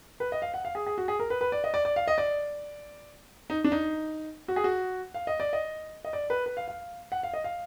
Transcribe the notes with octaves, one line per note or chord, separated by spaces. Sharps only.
B4
D#5
F5
F#5
F5
G#4
G#4
F#4
G#4
A#4
B4
B4
D5
D#5
D5
D5
F5
D#5
D5
D#4
D4
D#4
F#4
G#4
F#4
F5
D#5
D5
D#5
D#5
D5
B4
B4
F5
F5
F#5
F5
D#5
F5